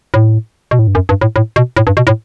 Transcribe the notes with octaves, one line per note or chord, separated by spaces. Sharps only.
A2
B2
A2
G2
F#2
G2
A2
A2
B2
A2
G2
B2
A2